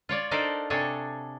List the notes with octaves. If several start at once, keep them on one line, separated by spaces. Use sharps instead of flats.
F4 C#5 D5
D4 D#4 A4 A#4 C5 D5
C3 D4 G#4 A4 C#5